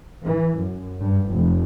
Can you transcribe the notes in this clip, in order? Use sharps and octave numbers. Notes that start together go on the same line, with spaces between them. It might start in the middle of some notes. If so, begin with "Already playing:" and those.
E3
F#2
G2
F1